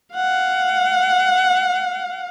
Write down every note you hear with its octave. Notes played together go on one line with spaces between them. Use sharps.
F5 F#5